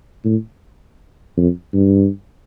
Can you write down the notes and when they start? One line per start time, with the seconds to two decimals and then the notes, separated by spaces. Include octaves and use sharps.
0.24 A2
1.37 F2
1.73 G2